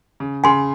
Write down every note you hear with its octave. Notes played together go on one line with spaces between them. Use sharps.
C#3
C#3 G#5 C6